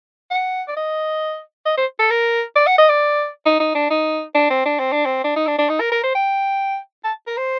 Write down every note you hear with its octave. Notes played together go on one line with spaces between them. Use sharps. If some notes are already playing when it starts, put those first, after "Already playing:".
F#5
D5
D#5
D#5
C5
A4
A#4
D5
F#5
D#5
D5
D#4
D#4
D4
D#4
D4
C4
D4
C4
D4
C4
D4
D#4
D4
D4
D#4
A#4
A#4
C5
G5
A5
A#4
C5